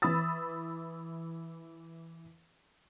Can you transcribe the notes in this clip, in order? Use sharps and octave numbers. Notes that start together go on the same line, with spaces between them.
E3 B5 D#6 E6 A6